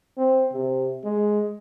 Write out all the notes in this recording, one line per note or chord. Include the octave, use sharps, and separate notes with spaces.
C4
C3
G#3